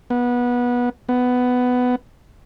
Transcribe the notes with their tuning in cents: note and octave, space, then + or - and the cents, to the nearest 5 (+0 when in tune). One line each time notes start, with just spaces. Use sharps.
B3 -20
B3 +10